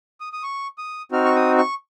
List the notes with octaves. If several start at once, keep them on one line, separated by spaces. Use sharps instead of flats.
D#6
D#6
C#6
D#6
C4 D#4 F#4 F6
C#6
D#6
C#6